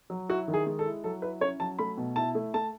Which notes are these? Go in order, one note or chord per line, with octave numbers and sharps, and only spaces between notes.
F#3
E4 F#4
D#3
G#4
G#3
A4
E4
F#3 A4
E4 B4
C#4 C#5
F#3 A5
A3 B5
B2
E4 A5
A3
A3 A5